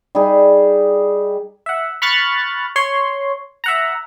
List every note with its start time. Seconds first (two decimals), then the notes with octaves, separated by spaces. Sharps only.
0.15 G3 D#4 G#4
1.66 E5 F#5
2.02 B5 C#6 F6 F#6 A6
2.76 C#5 C6
3.64 E5 F#5 A#5